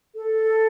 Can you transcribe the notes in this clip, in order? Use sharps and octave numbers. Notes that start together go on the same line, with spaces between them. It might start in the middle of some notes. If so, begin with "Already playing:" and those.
A4